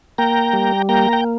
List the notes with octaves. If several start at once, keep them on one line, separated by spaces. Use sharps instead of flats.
A#3 G5 A#5
G3
A#3 G5 A#5
G5